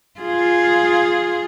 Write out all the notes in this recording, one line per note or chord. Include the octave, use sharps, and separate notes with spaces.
F4 G#4